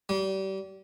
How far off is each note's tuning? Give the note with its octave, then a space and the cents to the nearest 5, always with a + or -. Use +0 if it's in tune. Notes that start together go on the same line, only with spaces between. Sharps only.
G3 -30